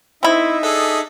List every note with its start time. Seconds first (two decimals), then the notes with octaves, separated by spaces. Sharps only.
0.23 C4 D#4 E4 E5
0.63 D4 G#4 A4